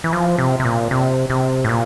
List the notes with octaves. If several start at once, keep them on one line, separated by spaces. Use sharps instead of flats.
E3
F3
C3
C3
A#2
C3
C3
A2
A#2